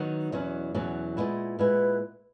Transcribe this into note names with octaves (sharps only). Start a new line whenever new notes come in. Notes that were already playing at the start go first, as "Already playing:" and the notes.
Already playing: D#3 F#3 B3 D#4
E2 B2 F#3 C#4
E2 B2 F#3 C#4
A#2 G#3 B3 E4
A#2 G#3 B3 E4 B4